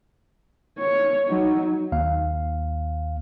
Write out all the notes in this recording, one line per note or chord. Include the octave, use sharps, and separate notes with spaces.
C#5
F#3 D#4
D#2 F5